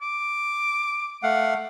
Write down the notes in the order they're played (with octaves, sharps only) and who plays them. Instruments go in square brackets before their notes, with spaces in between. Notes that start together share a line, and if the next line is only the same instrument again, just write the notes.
[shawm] D6
[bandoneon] A3 F5 F#5